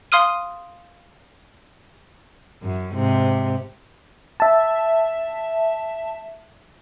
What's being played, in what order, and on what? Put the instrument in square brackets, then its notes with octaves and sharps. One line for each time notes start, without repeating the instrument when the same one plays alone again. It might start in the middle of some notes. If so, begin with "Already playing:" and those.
[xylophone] F5 C6 D#6 F6 D#7
[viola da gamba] F#2
G#2 C3
[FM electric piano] E5 A5